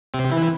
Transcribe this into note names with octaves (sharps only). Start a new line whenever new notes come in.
C3 C4
E3 E4